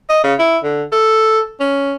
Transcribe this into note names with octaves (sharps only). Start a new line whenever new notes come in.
D#5
C#3
E4
D3
A4
C#4